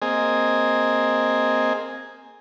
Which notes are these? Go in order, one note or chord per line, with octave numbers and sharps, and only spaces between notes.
A#3 C4 G#4 D#5 G#5